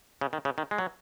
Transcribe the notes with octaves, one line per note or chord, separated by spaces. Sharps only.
C#3
D#3
C#3
D#3
G#3
F#3